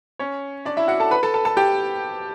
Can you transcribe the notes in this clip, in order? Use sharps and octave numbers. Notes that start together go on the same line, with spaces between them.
C#4 C#5
D4 D5
E4 E5
F#4 F#5
A4 A5
B4 B5
A4 A5
A4 A5
A4 A5
G4 G5